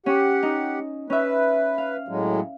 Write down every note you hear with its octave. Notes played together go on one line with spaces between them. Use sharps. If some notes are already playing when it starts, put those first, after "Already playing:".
C#4 G4 F#5
D#4
C#4 B4 E5
F5
A2 F#3 G#3